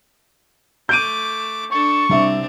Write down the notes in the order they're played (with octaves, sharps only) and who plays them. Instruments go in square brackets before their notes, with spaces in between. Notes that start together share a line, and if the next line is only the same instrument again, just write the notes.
[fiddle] A3 D6 [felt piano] G6 D7 D#7
[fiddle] D4 A4 [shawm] C#6
[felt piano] C2 E5 [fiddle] C4 D4